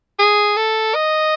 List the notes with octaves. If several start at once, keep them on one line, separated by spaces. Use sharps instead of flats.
G#4
A4
D#5